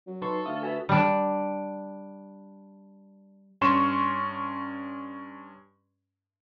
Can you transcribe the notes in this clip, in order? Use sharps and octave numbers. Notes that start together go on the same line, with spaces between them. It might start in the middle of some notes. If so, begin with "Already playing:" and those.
F#3
D#4 A4 B4 C6 C#6
D2 E5 F5 D#6 F6
F#4 B4 E5 G#5
G3 D4
G2 C#4 C6 C#6 E7